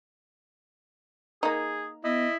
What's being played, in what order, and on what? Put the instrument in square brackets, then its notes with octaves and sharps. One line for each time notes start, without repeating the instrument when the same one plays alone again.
[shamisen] A#3 D#4 [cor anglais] G#4
[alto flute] B3 [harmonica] E4 [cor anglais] D#5